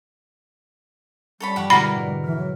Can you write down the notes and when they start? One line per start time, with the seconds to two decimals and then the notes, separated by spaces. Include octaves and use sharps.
1.40 G3 A4 C#5 B5
1.56 G2 F3 G4 F#5 C#6
1.70 B2 D3 G#3 E4 F#4 A#4 B5
1.95 G#2 D#4
2.24 E3 F6 B6
2.36 F#3